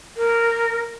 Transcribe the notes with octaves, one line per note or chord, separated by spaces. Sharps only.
A#4